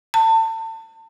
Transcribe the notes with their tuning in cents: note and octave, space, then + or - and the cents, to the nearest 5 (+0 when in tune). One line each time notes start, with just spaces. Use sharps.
A5 +35